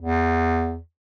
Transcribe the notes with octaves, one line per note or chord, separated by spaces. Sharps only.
E2